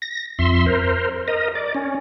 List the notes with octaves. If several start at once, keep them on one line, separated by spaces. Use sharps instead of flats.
A#6
F2 E5 C6
A#4 C5
A#4 D#5
D5
C#4